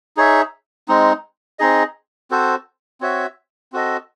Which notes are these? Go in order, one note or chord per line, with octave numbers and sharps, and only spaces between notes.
D#4 G#4 C#5 E5
G#3 C4 D#4
C4 D#4 G#4 D#5
C4 F#4 A4 C5
C4 F#4 C#5 E5
C4 F#4 A4 D#5